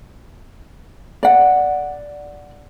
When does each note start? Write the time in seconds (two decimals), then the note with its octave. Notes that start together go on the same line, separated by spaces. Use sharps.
1.23 D5 F#5